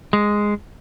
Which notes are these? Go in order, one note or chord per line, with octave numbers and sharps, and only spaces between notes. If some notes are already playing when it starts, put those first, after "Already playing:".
G#3